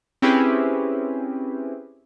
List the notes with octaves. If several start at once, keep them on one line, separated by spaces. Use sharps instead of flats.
C4 C#4 E4 G4 G#4 B4